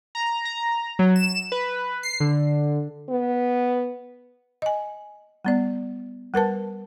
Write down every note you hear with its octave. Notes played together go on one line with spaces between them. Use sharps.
A#5
A#5
F#3
E7
B4
C7
D3
B3
D#5 G#5
G3 B3 D5
G3 A#4 B4 A5